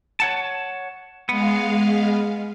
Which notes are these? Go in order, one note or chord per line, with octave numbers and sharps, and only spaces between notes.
C#5 F#5 A5
G#3 B3 F5